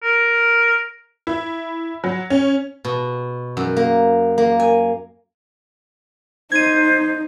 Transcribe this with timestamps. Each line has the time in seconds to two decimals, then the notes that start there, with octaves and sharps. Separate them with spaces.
0.03 A#4
1.27 E4
2.04 F#3
2.30 C#4
2.84 B2
3.57 F#2
3.76 A#3
4.38 A#3
4.60 G#5
6.52 D#4 C5 G#6 D#7